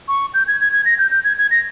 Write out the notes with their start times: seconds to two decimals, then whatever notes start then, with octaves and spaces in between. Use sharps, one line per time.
0.08 C#6
0.34 G6
0.48 G#6
0.61 G#6
0.73 G#6
0.85 A#6
0.98 G6
1.11 G6
1.24 G#6
1.38 G#6
1.51 A#6